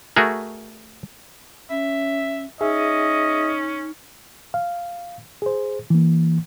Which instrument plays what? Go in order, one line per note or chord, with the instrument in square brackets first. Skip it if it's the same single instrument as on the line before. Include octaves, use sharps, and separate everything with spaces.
[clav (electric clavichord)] A3 F#4 G#4 A#4
[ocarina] C#4 [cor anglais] E5
[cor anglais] C#4 [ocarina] D#4 [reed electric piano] G#4 E5 [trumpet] D#5
[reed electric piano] F5
G#4 C5
E3 A#3